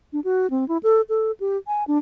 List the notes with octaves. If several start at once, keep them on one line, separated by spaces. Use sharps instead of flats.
D4
F#4
C4
E4
A4
A4
G4
G#5
D4